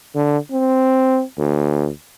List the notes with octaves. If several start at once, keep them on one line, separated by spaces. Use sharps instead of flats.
D3
C4
D2